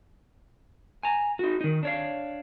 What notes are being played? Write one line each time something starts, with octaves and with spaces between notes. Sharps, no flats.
G#5 A#5
D#4 F#4
D#3 D#4
D4 C#5 F5